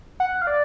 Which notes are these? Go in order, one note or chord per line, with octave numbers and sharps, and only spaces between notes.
F#5
F5
D5